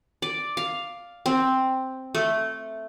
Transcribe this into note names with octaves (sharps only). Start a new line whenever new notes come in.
D5
F5
C4
A3